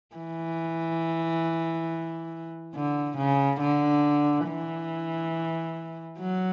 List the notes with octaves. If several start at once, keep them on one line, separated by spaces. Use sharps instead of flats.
E3
D3
C#3
D3
E3
F#3